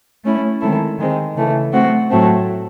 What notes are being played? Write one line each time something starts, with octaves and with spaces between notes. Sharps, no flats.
A3 C#4 E4
D#3 G#3 C4 E4 A4
D#3 G#3 C4
C#3 E3 A3
A3 C4 F#4
A2 F#3 A3 C4